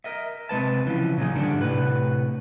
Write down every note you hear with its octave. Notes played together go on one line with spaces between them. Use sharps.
A#4 D#5 E5
C3 G#3 B4 A5
C#3 E3 F3
A#2 F#3 D#4 G#4
G#2 D3 G3 A3 D4
A2 C3 B4